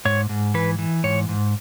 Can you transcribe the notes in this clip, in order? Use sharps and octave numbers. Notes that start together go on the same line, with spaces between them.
G#2 C#5
G#2
E3 B4
E3
G#2 C#5
G#2